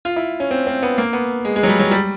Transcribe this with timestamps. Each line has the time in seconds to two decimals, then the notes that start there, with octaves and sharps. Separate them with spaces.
0.05 F4
0.16 E4
0.40 C#4
0.51 C4
0.67 C4
0.83 B3
0.98 A#3
1.13 B3
1.45 G#3
1.56 G#3
1.63 F#3
1.68 G3
1.79 F#3
1.91 G3